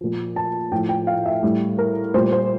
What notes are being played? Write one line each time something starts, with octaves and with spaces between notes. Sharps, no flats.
A#2 F3
A5
A2 F3 G5
G5
F5
E5
A2 G3
A#4
A#2 G3 C5
C5